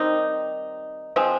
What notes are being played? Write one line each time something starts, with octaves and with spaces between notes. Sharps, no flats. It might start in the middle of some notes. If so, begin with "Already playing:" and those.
Already playing: D#3 G3 C4 D#4
F3 G#3 C4